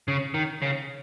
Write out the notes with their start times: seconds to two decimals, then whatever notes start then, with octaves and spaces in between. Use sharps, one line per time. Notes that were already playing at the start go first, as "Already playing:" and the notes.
0.08 C#3
0.34 D#3
0.62 C#3